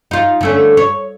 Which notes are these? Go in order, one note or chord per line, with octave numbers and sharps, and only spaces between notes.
D#4 F4
D3 A3 C#4
C#5